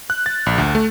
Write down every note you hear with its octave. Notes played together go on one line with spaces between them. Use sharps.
F#6
A6
A#1
D2
A3